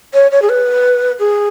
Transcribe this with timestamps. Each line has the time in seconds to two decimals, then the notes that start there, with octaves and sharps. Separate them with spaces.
0.14 C#5
0.31 C#5
0.42 G#4
0.49 B4
1.19 G#4